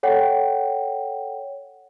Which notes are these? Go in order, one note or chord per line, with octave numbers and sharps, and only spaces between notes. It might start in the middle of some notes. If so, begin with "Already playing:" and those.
A4 C#5 F#5 G5